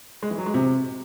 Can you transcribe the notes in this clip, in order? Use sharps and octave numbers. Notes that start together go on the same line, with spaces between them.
G#3
E3
F#3
G#3
C3